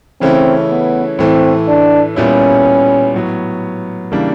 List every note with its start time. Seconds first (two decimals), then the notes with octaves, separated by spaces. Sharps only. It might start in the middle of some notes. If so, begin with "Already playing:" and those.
0.21 C#3 E3 A3 C4 C#4 E4
0.69 B3
1.19 A2 E3 A3 C4
1.68 D4
2.16 A#2 G3 B3 C#4 E4
3.14 A2 F#3 B3
4.12 C#3 E3 G3 A#3 D4